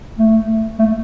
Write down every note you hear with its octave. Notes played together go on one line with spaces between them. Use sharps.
A3
A3